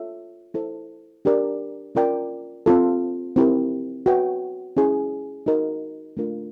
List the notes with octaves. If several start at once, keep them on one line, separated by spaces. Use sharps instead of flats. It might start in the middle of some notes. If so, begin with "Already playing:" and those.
Already playing: F4 A4 C#5 E5
E4 A4 C5
D4 G4 A#4 D5
C#4 F4 A#4 D5 G5
C4 F4 A4
C4 E4 G4 A#4
F#4 B4 E5 G5
C#4 E4 G#4
D#4 F#4 A#4 D#5
A3 D4 F4 A#4